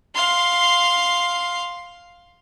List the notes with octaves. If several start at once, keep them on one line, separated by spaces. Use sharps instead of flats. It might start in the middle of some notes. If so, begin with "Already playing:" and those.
F5 C6